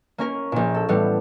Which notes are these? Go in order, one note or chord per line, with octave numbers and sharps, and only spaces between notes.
A#3 C#4 A#4
A#1 A#2
A4
A2 E3 G3 B3